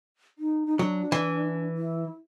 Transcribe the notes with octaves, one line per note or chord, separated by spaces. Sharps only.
D#4
D#4
F#3 D4
E3
E4